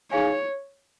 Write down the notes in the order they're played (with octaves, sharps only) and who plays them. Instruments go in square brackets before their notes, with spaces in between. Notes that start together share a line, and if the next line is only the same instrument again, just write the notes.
[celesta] D#4 G#4 F5 G#5 [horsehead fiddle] C#5